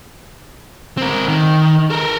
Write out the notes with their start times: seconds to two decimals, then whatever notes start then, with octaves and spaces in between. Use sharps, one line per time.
0.97 C4 A#4
1.28 D#3
1.90 A4 A#4